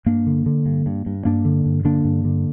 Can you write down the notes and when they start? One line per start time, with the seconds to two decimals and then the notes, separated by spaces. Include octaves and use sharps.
0.06 G2 A#3 D4
0.27 D3
0.46 D3
0.66 G2
0.86 G2
1.06 G2
1.25 G2 A#3 D4
1.45 D3
1.66 G2
1.85 D3 A#3 D4
2.05 G2
2.25 D3